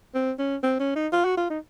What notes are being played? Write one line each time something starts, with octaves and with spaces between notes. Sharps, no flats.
C4
C#4
C4
C#4
D#4
F4
F#4
F4
D#4